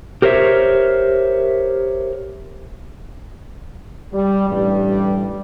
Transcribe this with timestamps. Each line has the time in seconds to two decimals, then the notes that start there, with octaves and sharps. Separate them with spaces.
0.22 G4 A#4 C5 C#5 E5
4.13 G3
4.50 A1 G2 G3